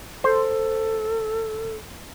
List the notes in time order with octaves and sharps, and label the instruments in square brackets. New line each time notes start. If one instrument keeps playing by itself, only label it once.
[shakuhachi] A4 [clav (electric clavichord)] C5